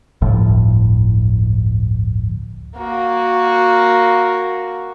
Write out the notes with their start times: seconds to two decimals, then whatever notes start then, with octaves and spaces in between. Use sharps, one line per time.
0.22 G1 D2 A2 F3
2.78 A#3 F#4